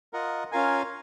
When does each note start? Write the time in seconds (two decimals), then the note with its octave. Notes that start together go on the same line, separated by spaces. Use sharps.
0.13 F4 A#4 D#5 F#5
0.52 C#4 F4 A#4 F5 G#5